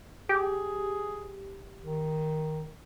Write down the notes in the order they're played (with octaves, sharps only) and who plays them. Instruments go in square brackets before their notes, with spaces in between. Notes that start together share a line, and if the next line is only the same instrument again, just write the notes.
[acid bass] G4 [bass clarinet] G#4
[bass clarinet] D#3